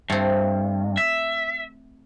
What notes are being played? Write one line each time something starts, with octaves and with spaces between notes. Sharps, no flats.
G2 A3 C4
E5